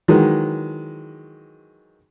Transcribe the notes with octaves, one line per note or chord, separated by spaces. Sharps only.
D#3 E3 F#3 G#3